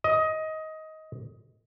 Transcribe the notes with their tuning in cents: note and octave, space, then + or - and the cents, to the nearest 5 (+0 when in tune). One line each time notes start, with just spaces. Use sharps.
D#5 +15